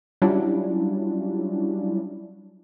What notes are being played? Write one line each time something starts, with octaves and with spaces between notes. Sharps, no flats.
F#3 G3 C#4 D4 E4 F4